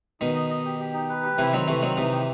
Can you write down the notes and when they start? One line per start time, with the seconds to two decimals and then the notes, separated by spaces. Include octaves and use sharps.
0.20 B2 D#3 D#4
0.35 D#5
0.50 D#5
0.65 G4
0.80 G4
0.94 D#4
1.09 B4
1.23 G4
1.38 C3 E3 E4
1.53 D#3 F#3 C4
1.67 C3 E3 A3
1.83 D#3 F#3 C4
1.97 C3 E3 D#4
2.12 G4